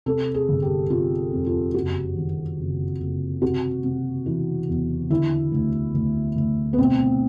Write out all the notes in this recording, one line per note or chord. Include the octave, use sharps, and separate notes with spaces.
C3 A4
G#4
G1
G4
C3 F4
F2
F4
F#1 F#4
D#3
F#1
F#1
C3 F#4
C3
E3
E2
D3 E4
D2
D2
D2
B3
B2 C4